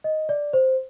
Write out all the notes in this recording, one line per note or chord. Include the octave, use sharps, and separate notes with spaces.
D#5
D5
C5